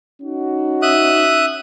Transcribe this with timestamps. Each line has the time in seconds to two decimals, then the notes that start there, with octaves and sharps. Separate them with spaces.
0.23 C#4 D#4 F#4
0.82 E5 D#6 F#6